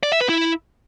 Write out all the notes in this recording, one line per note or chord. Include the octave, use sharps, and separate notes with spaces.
D5
E5
B4
E4